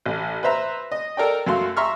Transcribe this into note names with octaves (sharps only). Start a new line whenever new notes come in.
A1
B4 C5 E5 A#5
D#5
A4 A#4 D5 G5
F#2 A3 F#4 F5 C6
E5 A#5 C6 C#6 E6 F6